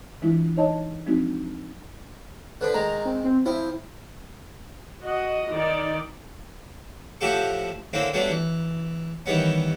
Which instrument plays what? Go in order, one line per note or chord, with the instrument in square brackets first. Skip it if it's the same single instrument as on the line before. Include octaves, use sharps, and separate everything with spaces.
[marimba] E3 G#3 D4 E4 F4
D#4 C#5 D#5 A5
F3 G#3 C4 D4 D#4 F#4
[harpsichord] D3 F3 D4 [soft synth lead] B4
[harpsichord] D#3 G#3 [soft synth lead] A#5
[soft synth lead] C4
C4
[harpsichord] F3 C4 [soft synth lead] E4
[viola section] F#4 D#5
D#3 D5
[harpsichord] A2 F3 F#4 G4 A4 C#6
D3 A#3 C4 C#4 E4
F#3 G3 A3 B3 C#4 D4
E3
D#3 E3 G3 B3 C#4